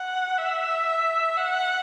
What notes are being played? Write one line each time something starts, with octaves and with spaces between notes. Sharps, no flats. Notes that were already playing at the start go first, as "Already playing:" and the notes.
Already playing: F#5
E5
F#5